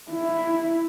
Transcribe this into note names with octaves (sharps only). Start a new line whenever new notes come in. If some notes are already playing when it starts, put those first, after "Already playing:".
E4